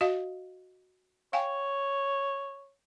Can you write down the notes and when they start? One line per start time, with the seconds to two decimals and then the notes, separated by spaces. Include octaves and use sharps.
0.01 F#4 D#5 F5
1.33 C#5 F5 G5 G#5